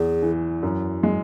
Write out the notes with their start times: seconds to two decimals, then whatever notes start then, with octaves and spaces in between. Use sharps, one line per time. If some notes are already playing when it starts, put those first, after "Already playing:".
Already playing: E2 G#4
0.22 E3
0.63 F#2
1.03 G#3